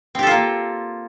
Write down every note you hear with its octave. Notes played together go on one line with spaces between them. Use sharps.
A#3 C4 F4 G4 A4